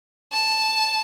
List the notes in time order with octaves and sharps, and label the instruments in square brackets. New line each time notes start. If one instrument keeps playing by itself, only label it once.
[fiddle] A5